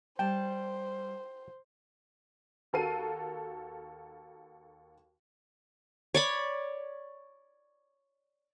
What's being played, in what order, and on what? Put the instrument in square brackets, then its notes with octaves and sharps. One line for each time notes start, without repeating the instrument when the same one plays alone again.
[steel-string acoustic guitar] G3 A5 [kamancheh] C5 [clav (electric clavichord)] G5
[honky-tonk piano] D#2 F#4 A4 A#4 C7 D#7
[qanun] C#5 D5 B5